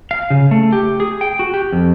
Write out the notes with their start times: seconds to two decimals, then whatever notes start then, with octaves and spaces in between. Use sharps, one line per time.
0.11 F5
0.30 C#3
0.51 A3
0.73 G4
1.00 G#4
1.21 G5
1.39 F#4
1.54 G4
1.72 F2